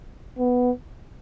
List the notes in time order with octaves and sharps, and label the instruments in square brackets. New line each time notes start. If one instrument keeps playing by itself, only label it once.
[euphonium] B3